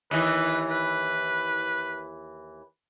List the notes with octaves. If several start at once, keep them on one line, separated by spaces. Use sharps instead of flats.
D#2 E3 B4
B4